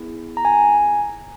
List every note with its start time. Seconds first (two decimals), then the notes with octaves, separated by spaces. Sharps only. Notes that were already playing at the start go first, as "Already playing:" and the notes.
Already playing: B3 E4 G#4
0.37 A#5
0.45 G#5